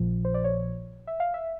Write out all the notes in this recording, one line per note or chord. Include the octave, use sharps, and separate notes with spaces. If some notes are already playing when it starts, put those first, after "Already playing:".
Already playing: A#1 A#2 F3
C5
D5
C#5
E5
F5
E5